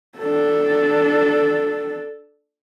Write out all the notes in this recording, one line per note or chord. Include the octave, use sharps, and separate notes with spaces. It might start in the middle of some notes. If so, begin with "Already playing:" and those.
D4 A4